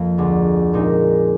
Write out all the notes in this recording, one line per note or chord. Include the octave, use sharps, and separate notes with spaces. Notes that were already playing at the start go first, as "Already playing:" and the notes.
Already playing: F2 A#3
D2 D3 G#3
A#2 G#3 C4 D#4 A#4